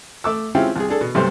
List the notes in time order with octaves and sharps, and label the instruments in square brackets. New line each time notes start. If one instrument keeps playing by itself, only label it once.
[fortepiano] A3 D6 E6
G#3 C4 C#4 E4 F4 G4
C2 G#4
D4 G#4 A4
B2
B1 G2 C3 A3 C5